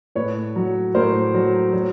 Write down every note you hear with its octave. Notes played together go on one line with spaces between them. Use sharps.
A2 B4 C#5
F#3
A2 A#4 C5
F#3
F#3